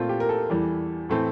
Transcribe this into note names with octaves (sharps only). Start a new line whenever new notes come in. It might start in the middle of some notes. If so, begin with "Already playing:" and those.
Already playing: A#2 A3 C4 F4
G4
A#4
A4
E2 E3 G3
A2 E3 A3 C4